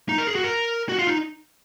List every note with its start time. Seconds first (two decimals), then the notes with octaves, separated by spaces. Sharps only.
0.09 D#4
0.18 A#4
0.27 G#4
0.35 F#4
0.44 A#4
0.89 F#4
0.99 F4
1.07 D#4